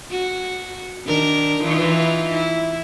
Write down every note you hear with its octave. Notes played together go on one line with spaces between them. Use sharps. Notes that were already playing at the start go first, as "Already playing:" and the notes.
F#4
D#3 D4 A#4
E3 D#4 F4
E4